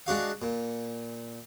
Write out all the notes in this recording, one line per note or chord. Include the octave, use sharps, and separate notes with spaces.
G#3 D4 F#4 F5
A#2